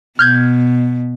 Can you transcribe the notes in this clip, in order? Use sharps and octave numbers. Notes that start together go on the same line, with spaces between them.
B2 F6 G6 G#6